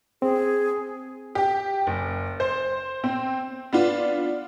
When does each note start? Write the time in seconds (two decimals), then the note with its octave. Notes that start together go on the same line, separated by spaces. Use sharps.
0.22 C4 G#4
1.35 G4
1.87 F#1
2.40 C5
3.04 C4
3.73 B3 D4 F4